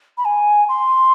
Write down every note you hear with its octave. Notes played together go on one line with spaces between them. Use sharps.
B5
G#5
C6